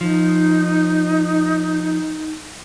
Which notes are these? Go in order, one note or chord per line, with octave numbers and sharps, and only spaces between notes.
F3 D#4